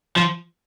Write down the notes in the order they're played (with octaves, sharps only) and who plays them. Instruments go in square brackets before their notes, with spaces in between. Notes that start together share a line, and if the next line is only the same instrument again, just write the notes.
[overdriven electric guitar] F3